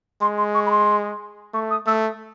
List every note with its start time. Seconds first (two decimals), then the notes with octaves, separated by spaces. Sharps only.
0.22 G#3 C6
0.38 C6
0.55 C#6
0.66 B5
0.71 C6
1.54 A3 C#6
1.71 D#6
1.86 A3 E6